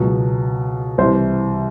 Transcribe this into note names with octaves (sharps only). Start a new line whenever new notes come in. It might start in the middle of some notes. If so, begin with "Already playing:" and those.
Already playing: C#2 B2 F#3
C2 C3 E3 C5